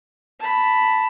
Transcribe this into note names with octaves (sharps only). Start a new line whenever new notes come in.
A5 B5